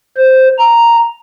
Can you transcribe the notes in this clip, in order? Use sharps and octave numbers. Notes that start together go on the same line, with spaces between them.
C5
A#5